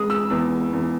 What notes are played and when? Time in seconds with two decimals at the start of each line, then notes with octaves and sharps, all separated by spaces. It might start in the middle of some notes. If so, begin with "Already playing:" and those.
Already playing: G#3 D#6
0.10 E6
0.30 E2
0.73 E2